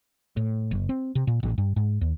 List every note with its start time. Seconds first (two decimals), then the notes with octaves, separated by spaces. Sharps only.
0.37 A2
0.71 F#1
0.89 C4
1.15 C3
1.27 A#2
1.43 A1
1.58 G2
1.76 G#2
2.01 D#2